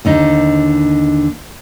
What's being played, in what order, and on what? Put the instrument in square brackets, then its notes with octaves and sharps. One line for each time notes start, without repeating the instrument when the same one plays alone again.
[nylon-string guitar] D#2 D3 D#4